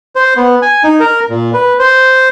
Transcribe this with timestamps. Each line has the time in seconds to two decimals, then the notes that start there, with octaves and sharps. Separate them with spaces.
0.16 C5
0.37 B3
0.62 G#5
0.84 D#4
1.00 A#4
1.30 A#2
1.54 B4
1.79 C5